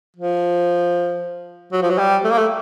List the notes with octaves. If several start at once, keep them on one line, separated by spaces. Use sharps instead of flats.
F3
F#3
F3
F#3
G3
A3
A#3
A3